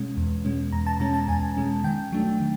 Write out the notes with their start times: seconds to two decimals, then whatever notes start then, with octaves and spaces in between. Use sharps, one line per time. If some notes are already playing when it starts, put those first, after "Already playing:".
Already playing: B2 G#3 C#4
0.17 E2
0.45 B2 G#3 C#4
0.72 E2 A#5
0.86 A5
1.00 B2 G#3 C#4 A#5
1.14 A5
1.28 E2 G#5
1.57 B2 G#3 C#4
1.84 D#3 G5
2.12 F#3 A3 D4
2.40 D#3